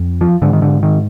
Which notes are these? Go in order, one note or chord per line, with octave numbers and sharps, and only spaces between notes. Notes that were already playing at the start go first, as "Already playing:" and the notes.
Already playing: F2
F3
G#2 D3
D#3
D3
D#3